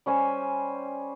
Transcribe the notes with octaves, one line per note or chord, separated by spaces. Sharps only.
G3 C#4 C5 G#5